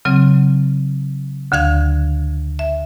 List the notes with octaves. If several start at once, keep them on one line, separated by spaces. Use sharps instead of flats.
C#3 F#3 C4
D2 D3 F5 G#6
E5